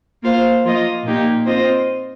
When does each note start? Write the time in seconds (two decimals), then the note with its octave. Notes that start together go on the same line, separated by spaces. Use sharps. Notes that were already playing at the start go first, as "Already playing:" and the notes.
0.22 A#3 F4 C5 F5
0.64 F3 A#3 F4 D#5
1.04 A#2 A#3 D#4 G4
1.46 C4 F4 C5 D#5